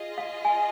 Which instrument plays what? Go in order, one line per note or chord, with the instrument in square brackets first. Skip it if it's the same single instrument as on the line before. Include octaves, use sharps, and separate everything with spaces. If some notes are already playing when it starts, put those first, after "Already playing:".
Already playing: [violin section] F4 G#4 D#5
[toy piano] F5
G#5